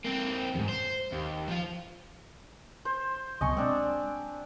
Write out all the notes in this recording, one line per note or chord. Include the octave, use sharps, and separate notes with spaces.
A#3 C4
E2 G#2
C5
D#2
F3 F4
C5
C#2 B2 F#3 D#5 G#5 C#6
G#3 C4 D4